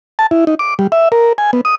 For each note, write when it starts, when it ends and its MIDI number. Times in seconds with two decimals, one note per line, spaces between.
0.19 0.27 81
0.31 0.45 64
0.47 0.55 63
0.59 0.74 86
0.79 0.87 55
0.92 1.08 76
1.12 1.33 70
1.38 1.51 80
1.53 1.61 59
1.65 1.75 87